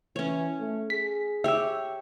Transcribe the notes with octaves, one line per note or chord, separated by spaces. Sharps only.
E3 C#4 C#5
A3
G#4 B6
G4 C#5 E5 E6